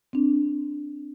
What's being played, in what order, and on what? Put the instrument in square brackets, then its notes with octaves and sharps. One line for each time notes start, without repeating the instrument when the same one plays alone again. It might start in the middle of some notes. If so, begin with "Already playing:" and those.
[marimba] C4 D4